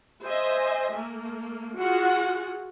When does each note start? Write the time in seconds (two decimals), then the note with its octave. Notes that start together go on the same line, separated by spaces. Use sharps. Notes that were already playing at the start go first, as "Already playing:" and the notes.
0.23 C5 D#5 E5 G#5
0.94 A3 A#3
1.76 F4 F#4 G#4 F#5